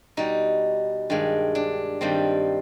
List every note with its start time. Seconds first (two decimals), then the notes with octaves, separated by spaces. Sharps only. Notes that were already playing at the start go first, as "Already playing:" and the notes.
0.17 B2 G3 D#4
1.10 G2 D#3 G#3
1.55 D4
2.01 G2 D#3 G3 C4